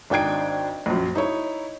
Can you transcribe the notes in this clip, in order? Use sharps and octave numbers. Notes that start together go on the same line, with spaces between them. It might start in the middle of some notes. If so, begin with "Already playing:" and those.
G#1 D4 D#4 G5 G#6 D7
A#1 F#2
D#4 E4 C#5